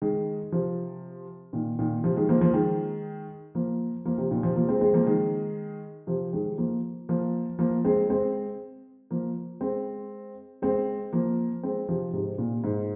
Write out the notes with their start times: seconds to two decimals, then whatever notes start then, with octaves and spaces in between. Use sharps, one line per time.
0.02 D#3 G#3
0.52 C3 F3
1.53 A#2 D#3
1.79 A#2 D#3
2.03 C3 F3
2.16 D#3 G#3
2.29 F3 A#3
2.41 F3 A#3
2.53 D#3 G#3
3.55 F3 A#3
4.05 F3 A#3
4.18 C3 F3
4.31 A#2 D#3
4.43 C3 F3
4.56 F3 A#3
4.68 G#3 C4
4.81 G#3 C4
4.94 F3 A#3
5.06 D#3 G#3
6.07 C3 F3
6.33 D#3 G#3
6.58 F3 A#3
7.09 F3 A#3
7.59 F3 A#3
7.85 G#3 C4
8.09 G#3 C4
9.11 F3 A#3
9.61 G#3 C4
10.62 G#3 C4
11.13 F3 A#3
11.63 G#3 C4
11.89 C3 F3
12.13 G#2 C3
12.38 A#2
12.64 G#2